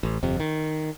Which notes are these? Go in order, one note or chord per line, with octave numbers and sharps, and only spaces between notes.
A1
G1 F2 C3
D#3